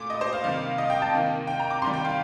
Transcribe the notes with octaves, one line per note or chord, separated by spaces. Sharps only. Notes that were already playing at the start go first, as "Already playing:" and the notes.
Already playing: A#2 A3 D6
D#5
C5
F5
C3 D#3 G3 A#3 F5
D#5
G5
A5
C3 D#3 A#3
G5
A#5
D6
C3 D#3 G3 C6
G5
F5